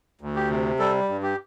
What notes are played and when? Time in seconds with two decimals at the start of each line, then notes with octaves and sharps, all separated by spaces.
0.21 D2
0.36 G4
0.50 C3
0.79 G3 A4
1.09 G2
1.23 G4